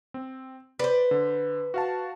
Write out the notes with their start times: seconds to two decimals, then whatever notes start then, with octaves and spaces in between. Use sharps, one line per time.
0.14 C4
0.79 B4 C5 D5
1.11 D3
1.74 F#4 F5 A5